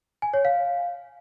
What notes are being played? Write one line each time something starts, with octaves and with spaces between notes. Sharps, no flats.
G#5
C#5
F5